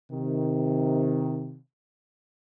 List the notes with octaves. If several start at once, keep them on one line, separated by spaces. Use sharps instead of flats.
C3 D#3